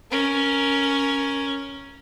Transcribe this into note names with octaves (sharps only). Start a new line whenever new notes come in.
C#4 A#4